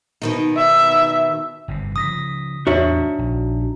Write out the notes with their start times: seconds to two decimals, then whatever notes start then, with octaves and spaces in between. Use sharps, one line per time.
0.22 B2 D#3 D#4
0.57 E5
1.68 G1 G#2 C3
1.96 C#3 E3 F3 D#6 A#6 B6
2.67 E2 A2 C3 D4 D#4 F#4 C#5 E5
3.19 A#1